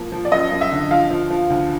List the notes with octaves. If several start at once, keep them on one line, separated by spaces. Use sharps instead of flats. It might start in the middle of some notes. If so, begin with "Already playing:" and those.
Already playing: F3 A#3
F3
D5
F#2 D#5
F#2
E5
D3
F3 F5
F3
F3
D2